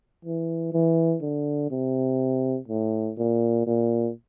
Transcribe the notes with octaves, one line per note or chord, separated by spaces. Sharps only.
E3
E3
D3
C3
A2
A#2
A#2